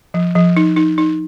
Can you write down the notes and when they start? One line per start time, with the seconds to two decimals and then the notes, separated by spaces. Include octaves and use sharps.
0.14 F3
0.35 F3
0.57 D#4
0.77 D#4
0.98 D#4